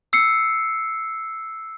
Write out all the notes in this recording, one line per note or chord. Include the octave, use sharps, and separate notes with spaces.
E6 C7 C#7